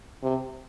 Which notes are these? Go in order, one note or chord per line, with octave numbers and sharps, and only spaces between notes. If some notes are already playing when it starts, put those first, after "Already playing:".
C3